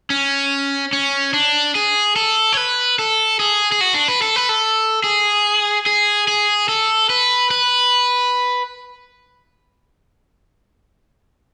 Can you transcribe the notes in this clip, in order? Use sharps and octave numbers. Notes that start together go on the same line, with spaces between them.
C#4
C#4
D4
G#4
A4
C#5
B4
A4
G#4
G#4
F#4
D4
B4
A4
B4
A4
G#4
G#4
G#4
A4
B4
B4